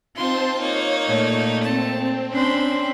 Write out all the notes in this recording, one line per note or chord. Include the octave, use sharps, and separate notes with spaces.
C4 D#4 F4 C5 A5 C6
A#3 D#4 C#5
A#2 A3
C4 A5
C#4 D4 C5 B5